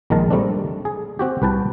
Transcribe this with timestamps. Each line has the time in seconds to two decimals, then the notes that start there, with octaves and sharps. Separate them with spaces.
0.10 A#1 D#3 G#3 A#4 A5
0.30 G3 A3 C4 D4
0.85 G#4
1.19 C4 F#4 G4
1.42 C2 B4 G5 A5